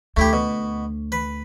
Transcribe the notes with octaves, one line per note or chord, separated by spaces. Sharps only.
D2 A3 E4 G4
B2
B4